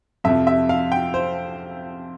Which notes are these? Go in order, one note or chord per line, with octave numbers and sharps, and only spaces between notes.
F2 C3 F3 E5
E5
F5
G5
C5